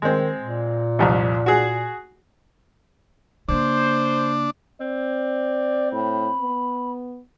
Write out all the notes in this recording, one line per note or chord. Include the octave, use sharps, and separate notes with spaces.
D#3 G#3 C4
A#2
C2 F2 C3
F#4 G#4
C#3 A#3 D4 C5
C4 D5
A2 B5
B3